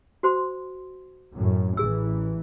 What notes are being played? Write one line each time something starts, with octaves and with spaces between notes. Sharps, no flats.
F#4 C5 C6
F#2 A2
A1 E3 G#4 E6